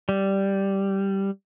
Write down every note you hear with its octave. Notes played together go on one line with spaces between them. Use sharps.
G3